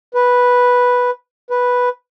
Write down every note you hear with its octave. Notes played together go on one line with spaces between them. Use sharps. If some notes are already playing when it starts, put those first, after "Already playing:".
B4
B4